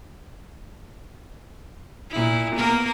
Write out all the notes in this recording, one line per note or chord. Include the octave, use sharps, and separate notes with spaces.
A#2 E4
A#3 B3 A#4